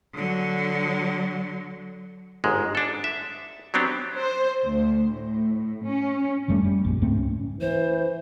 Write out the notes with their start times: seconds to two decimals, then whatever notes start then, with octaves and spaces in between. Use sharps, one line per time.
0.14 D3 F#3
2.44 G1 G#2 G#3
2.75 D4 A4
3.04 E5
3.74 F#3 B3 C4 D4 G4
4.18 C5
4.65 D2
5.12 A2
5.86 C#4
6.48 F#1 F#2 G3 A3
6.64 G3
6.85 A#1 F#2 G#3
7.02 C#2 G#2 A3 C4
7.17 C#4
7.61 E3 C5